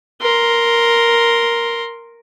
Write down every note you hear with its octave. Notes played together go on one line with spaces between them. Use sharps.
A#4 C6